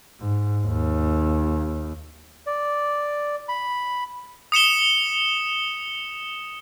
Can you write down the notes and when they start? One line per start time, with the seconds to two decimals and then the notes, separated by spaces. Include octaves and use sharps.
0.21 G#2
0.67 D#2
2.47 D5
3.49 B5
4.52 D#6 C#7 E7 G7